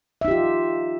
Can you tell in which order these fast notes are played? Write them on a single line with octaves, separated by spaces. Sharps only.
E5 D#4 G4 F4